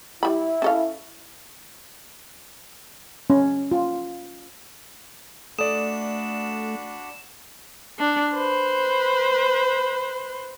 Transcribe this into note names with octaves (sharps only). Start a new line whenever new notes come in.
G3 E4 B5
C#4 A4 F5
C#4
F4
A3 D4 F#4 D5 B5 D#6 E7
D4
B4 C5